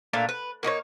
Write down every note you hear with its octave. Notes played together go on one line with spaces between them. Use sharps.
A#2 A3 D4 F5
B4
A#3 D#4 F#4 C#5